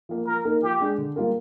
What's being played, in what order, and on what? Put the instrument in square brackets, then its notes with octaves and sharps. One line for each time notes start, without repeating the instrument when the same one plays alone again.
[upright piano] F3 A#3
[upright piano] F3 [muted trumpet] A#4
[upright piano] A#3 D#4 A#4
[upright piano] F3 [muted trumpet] G4
[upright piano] G#3 D4 G#4
D3
G3 A#3 F4 A#4